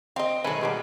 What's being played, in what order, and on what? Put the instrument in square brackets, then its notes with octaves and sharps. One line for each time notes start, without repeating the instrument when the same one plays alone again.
[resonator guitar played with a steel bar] C4 [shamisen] D#5 F5
[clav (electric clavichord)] B1 A4 B4 [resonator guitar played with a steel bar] D#3 G#3 [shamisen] E4
[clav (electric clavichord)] B2 G3 [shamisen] F#3 C#4 D#4